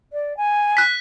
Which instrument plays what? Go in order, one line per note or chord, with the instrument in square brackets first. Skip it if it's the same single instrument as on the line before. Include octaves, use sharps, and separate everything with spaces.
[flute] D5
G#5
[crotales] F#6 B6